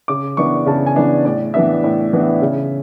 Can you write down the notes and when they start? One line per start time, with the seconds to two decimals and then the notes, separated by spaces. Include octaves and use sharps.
0.08 C#3 D6
0.37 E3 B3 D4 C#6
0.66 C#3 A5
0.86 G#5
0.96 E3 B3 D4
1.25 A2 D5
1.54 E3 B3 D4 E5
1.84 A2
2.13 E3 B3 D4
2.42 C#3